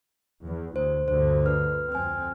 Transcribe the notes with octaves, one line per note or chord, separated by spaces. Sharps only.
E2
D2 C5
D2 G2 D3 C5
B4 F6
F2 C4 G#5 F6